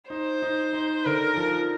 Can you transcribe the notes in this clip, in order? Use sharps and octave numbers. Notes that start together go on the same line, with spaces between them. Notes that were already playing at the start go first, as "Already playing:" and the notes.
D#4 C5
D#4
D#4
D3 A#4
F3